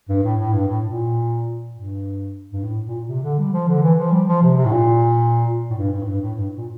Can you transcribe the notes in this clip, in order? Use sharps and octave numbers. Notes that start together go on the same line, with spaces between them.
G2
A2
A2
G2
A2
A#2
G2
G2
A2
A#2
C3
D3
G3
F3
D3
E3
F3
G3
F3
C3
C3
A2
A#2
A2
G2
G2
A2
G2
A2
G2
A#2